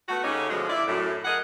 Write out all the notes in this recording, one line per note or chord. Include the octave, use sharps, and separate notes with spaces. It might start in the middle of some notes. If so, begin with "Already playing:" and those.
A3 B3 F#4
C#3 A3 C#4 D#4 G4
B2 D3 F3 F#3 G#3
E4 D5
F#2 A2
G#4 A#4 D#5 F#5